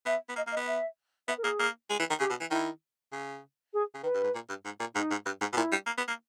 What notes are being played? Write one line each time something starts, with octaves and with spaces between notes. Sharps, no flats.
B3 E5
B3
A#3 D#5
A#3
D#5
B3
E5
B3 E5
A#4
A#3 G#4
A#3
G#3
E3
D#3
C#3 G4
B2
E3
D#3 E4
C#3
G#4
C#3
D#3 B4
G2
G#2
A#2
G2
G#2
A#2
G#2 D#4
G#2
G2
G#2
B2
A#2 E4
G3
A#3
B3
A#3